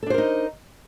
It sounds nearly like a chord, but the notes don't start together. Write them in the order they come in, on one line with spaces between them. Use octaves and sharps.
A4 D4 C5 A#4 D#4